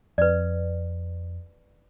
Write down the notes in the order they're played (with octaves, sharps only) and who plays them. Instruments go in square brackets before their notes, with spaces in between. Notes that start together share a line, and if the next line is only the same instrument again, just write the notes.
[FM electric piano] F2 [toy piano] B4 D5